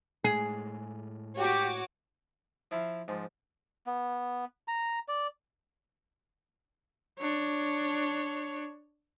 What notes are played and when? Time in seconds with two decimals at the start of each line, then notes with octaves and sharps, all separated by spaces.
0.24 A2 G#3 G#4
1.37 F#4 G4 C#5 D6
2.71 F3 E4 E5 F5
3.08 G#2 F3
3.87 B3
4.68 A#5
5.08 D5
7.19 D4 C#5